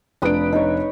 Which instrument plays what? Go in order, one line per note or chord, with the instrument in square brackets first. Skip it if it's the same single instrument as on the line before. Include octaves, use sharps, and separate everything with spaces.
[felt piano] F1 D4 D7 [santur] B4 B5 D#6
[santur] D#4 C#5